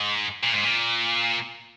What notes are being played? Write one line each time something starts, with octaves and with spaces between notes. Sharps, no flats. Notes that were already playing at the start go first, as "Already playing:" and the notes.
Already playing: G#2
A#2
G#2
A#2